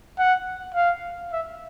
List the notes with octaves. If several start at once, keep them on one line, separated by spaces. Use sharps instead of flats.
F#5
F5
E5